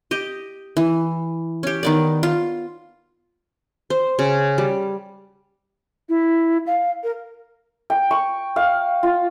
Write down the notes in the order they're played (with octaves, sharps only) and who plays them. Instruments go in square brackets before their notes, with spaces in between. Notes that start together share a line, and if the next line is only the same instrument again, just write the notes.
[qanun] G4 D#5
E3
C#4 G4
D#3 B3 D5
F4
C5
C#3
G3
[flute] E4
F5
A#4
[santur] G5
C#6
F5
F4